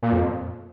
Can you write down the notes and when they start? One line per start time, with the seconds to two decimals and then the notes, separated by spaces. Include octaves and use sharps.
0.03 A#2
0.13 F2